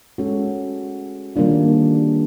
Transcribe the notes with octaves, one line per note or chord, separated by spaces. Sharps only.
G#3 C#4 F#4 A4
D#3 G3 A#3 D4 F4